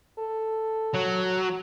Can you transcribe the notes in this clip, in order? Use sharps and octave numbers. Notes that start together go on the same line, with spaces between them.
A4
F#3